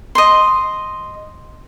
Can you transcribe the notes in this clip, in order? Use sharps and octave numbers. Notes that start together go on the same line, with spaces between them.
D#5 C6